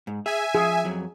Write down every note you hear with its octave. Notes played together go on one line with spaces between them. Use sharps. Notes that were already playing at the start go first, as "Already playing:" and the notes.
G#2
G#4 E5 G#5
F3 G#4
F2 F#3